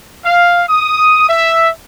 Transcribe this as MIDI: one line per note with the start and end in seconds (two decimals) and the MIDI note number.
0.24 0.63 77
0.69 1.27 87
1.29 1.69 76